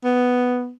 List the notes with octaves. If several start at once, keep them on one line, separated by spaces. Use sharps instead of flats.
B3